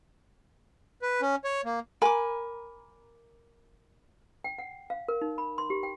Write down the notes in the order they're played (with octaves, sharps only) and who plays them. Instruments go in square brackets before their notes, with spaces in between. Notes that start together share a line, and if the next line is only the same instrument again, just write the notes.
[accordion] B4
C#4
C#5
A#3
[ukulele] A#4 B5 [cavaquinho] G#5 D6
[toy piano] G5
F#5
F5
A#4
D#4
B5
C6
G4
G5